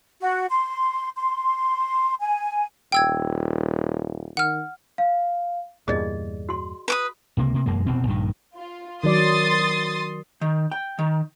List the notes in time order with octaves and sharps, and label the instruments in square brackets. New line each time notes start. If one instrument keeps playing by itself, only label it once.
[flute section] F#4
C6
C6
G#5
[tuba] D#1 [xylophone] G5 E6 G#6
[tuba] D#3 [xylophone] F#5 F6
[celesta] F5
[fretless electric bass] E2 G2 A#2 [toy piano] G#4 D5 D#5
[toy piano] F#4 C6
[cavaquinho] B4 D6 D#6
[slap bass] C#2 C3 A#3
C3 A#3
E1 F#2 G#3 A#3
F1 E2 B2 C4
A#1 G2 A#2 D#3
[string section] F4
[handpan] D#3 F#3 D5 [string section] C6 D#6 A6
[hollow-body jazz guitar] D#3
G5
D#3